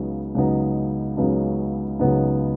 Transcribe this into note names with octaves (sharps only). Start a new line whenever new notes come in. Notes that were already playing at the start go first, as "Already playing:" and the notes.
Already playing: C#2 C#3 F#3 B3 D#4
C#2 C#3 F#3 B3 D#4
C#2 C#3 F#3 B3 D#4
C#2 C#3 F#3 B3 D#4